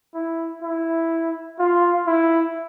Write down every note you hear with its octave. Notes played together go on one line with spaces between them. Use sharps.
E4
E4
F4
E4